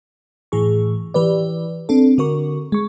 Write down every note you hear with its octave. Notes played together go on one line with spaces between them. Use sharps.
A2 E3 G#4 C#6
E3 G4 B4 D5
C4 D4 A4
D3 F#4 A#4 C#6
G#3 C#6